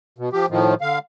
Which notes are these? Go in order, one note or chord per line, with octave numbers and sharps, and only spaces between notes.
B2
F3 G4
A2 D#3 F3
D3 F5